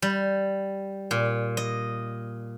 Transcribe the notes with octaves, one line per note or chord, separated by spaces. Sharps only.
G3
A#2
D#5